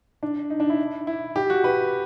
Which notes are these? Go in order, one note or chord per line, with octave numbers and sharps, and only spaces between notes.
D4
D#4
D4
E4
E4
G4
F#4
B4